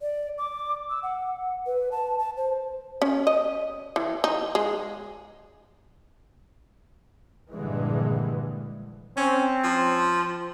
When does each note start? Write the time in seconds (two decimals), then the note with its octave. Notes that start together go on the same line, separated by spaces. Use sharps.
0.01 D5
0.38 D6
0.90 E6
1.03 F#5
1.66 B4
1.92 A5
2.19 A5
2.37 C5
3.02 C#4
3.27 D#5
3.96 E3
4.24 D#4
4.55 G#3
7.52 A#1 G2 D3 E3 G#3
9.17 C4 C#4
9.64 F3